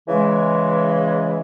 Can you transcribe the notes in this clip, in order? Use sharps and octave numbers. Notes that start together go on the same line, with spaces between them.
C#3 E3 G#3